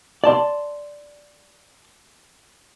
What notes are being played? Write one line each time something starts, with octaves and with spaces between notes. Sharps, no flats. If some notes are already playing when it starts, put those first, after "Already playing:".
D5 A5 C6